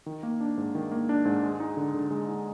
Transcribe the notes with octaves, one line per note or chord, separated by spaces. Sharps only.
D#3
A#3
D4
G#2
D#3
A#3
D4
G#2
G#3
D#4
D3
D3
G#3
D#4